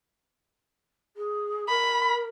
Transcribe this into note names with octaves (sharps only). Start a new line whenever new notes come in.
G#4
A#4 B5